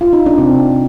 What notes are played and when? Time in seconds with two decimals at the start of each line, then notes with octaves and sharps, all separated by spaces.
0.01 F4
0.13 D#4
0.26 D4
0.38 C3 C4